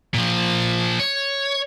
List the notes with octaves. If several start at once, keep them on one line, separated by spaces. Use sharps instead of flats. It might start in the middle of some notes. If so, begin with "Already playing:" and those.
A#2 F3
C#5